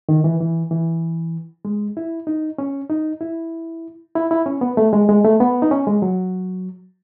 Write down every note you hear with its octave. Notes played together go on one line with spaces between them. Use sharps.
D#3
E3
E3
E3
G#3
E4
D#4
C#4
D#4
E4
E4
E4
C#4
B3
A3
G#3
G#3
A3
B3
D#4
C#4
G#3
F#3